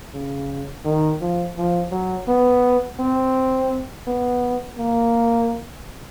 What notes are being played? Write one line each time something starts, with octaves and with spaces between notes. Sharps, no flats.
C#3
D#3
F3
F3
F#3
B3
C4
B3
A#3